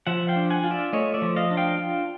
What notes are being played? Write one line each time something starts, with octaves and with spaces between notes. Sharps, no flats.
F3 E5 F#5
F5 G5
D4
F#5 G#5
F4
D5 E5
A3 C#5 D#5
D5 E5
F3
D#5 F5
D4
F5 G5
F4